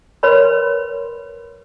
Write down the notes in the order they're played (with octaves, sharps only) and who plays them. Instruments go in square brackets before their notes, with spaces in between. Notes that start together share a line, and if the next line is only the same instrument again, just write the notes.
[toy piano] A#4 B4 C#5 B5 C6